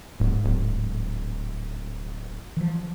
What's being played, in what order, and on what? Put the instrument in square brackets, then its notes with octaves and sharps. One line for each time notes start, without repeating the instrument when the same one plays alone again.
[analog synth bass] D1 [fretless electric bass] G#2
[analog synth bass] D1
[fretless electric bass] E3 F3